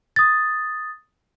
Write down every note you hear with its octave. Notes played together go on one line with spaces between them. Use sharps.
D#6 A6